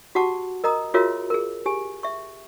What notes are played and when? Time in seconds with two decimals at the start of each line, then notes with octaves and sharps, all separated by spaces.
0.15 F#4 G4 F#5 A5 D6
0.64 A#4 D#5 A#5 D#6
0.94 F4 F#4 G#4 A#4 C#5 E5
1.30 G#4 A#4
1.66 G4 G#4 G#5
2.03 E5 C#6